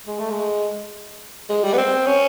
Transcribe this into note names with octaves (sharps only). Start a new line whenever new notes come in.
G#3
A3
G#3
G#3
G3
B3
C4
C#4